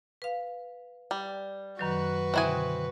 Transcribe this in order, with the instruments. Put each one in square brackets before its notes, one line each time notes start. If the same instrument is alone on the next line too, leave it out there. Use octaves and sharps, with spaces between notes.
[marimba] B4 F5
[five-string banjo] G3
[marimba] F#2 D#3 F#3 [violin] F#4 B4
[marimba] B2 D3 [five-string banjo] C4 E4 G#5